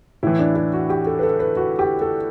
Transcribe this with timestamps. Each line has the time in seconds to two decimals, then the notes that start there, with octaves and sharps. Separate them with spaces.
0.23 A2 E3 E4
0.39 D4
0.56 E4
0.73 F#4
0.90 G4
1.07 A4
1.19 B4
1.23 A4
1.39 B4
1.56 F#4
1.79 G4
2.01 A4